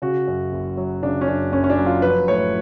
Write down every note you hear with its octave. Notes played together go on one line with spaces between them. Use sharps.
C#3 F#4
F#2
F#1
F#3
C#3 D4
C#4
F#2 D4
F#1 C#4
C#4
D4
F#3
F4
F3 B4
A2 C#5